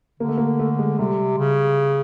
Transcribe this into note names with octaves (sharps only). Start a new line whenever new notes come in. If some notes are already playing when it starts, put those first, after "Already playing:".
D3 A#3
A3
A#3
A3
G#3
C3 G3
C#3